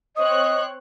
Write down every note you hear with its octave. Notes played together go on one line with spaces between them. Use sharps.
C4 C#5 D#5 D#6 F#6